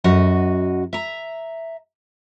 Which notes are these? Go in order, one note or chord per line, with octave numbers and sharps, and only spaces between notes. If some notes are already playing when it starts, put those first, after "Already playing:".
F#2 F#4 D#5
E5 A#5